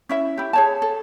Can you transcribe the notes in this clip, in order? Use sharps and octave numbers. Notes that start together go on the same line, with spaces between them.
C#4 E4 E5
E4 G4
G#4 C#5 A5
A4